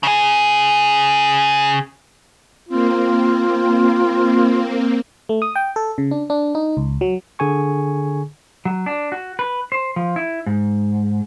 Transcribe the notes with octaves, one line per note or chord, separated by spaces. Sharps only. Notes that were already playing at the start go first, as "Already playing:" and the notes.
C#3 G#4
A#3 C4 F4
A3
D#6
G5
A4
C#3
D4
D4
D#4
C#2
F#3
D3 G#4 G#5 C#6
F#3
D4
F#4
B4
C5
F3
E4
G#2